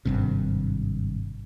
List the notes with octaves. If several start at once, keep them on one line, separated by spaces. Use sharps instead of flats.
G#1 G2 C3